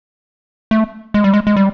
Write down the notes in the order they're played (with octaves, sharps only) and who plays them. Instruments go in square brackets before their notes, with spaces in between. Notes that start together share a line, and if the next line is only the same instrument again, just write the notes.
[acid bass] A3
G#3
G3
G#3
G#3
G3